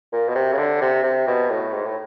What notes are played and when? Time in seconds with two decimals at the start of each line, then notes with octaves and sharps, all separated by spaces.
0.13 A#2
0.29 B2
0.35 C3
0.53 C#3
0.57 D3
0.81 C3
1.03 C3
1.27 B2
1.50 A2
1.73 G#2
1.86 A2